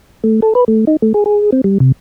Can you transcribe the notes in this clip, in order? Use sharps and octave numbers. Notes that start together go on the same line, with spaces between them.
A3
A4
B4
A3
D#4
A3
G#4
G#4
C4
G3
C3